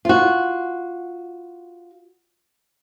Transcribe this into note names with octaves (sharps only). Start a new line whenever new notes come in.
F4 F#4